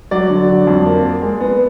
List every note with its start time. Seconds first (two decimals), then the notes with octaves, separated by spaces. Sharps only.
0.11 F#3 D5
0.30 D3
0.49 F#3
0.67 F2
0.85 A#3
1.04 A#3
1.22 G#3
1.41 B3